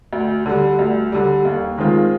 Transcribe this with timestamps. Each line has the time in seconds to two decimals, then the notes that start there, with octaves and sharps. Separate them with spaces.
0.13 D2
0.46 D3 G3
0.79 D2
1.12 D3 G3
1.45 D#2
1.78 D#3 G#3 C4 F4